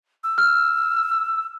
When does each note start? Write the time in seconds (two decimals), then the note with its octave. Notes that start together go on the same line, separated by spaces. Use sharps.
0.24 E6
0.38 F6